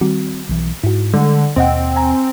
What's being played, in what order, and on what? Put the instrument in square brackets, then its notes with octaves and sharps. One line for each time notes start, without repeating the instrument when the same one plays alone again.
[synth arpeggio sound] D#3 G3 F#4 [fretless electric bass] C4
[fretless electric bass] B1 E3
[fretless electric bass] G#2 [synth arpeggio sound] E4 F#4
[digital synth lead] D3 [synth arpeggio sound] G3 [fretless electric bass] G#3
[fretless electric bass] D#2 B2 [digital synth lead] C4 [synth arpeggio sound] C5 D#5 F#5
[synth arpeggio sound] G#5 A#5